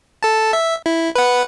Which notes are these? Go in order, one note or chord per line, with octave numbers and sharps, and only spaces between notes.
A4 A5
E5
E4
B4 F#5